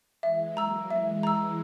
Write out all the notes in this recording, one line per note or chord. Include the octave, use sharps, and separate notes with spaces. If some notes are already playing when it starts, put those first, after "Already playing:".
E3 G#3 E5
F#3 A#3 A#5 E6
E3 G#3 E5
A#5 E6